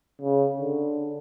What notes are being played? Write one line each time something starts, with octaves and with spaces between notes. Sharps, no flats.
C#3
D3